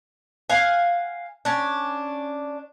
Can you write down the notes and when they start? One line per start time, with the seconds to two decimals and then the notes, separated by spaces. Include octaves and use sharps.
0.50 F5 F#5 G#5
1.45 C#4 D4